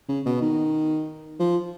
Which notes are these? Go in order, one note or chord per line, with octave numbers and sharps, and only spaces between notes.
C#3
B2
D#3
F3